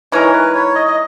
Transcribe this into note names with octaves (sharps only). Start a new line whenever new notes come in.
E3 G#3 D#4 A#4 C#5
B4
C#5
D#5
D#5